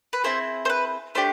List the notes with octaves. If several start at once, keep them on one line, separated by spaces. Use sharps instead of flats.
B4
C4 E4 G#4 C5
C5
B4
A3 D4 G4 C5